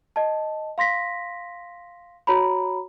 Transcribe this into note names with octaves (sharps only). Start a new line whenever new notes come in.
D#5 A5
F5 C6 A#6 B6
F#4 C#5 A#5 B5